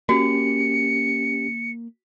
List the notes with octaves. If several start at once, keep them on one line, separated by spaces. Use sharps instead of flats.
A#3 C#4 F#4 G4 C#7